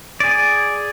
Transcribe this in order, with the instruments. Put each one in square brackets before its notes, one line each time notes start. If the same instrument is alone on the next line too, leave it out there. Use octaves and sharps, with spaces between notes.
[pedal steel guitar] G#4 D5